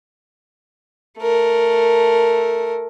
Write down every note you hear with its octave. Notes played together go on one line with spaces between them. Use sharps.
A3 A#4